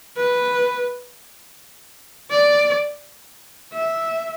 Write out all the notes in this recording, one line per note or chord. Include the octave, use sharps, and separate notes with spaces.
B4
D5
E5